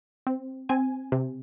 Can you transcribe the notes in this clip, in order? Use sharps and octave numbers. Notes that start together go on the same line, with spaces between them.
C4
C4 G#5
C3